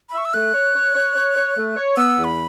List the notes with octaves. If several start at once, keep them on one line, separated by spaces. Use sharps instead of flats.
B5
E5 C#6
E6
A3 F#6
C#5
C#5
C#5
C#5
C#5
A3
C#5
B3 E6
E2
B5